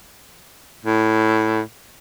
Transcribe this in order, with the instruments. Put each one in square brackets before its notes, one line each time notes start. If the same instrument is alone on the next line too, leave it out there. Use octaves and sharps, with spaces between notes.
[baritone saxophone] A2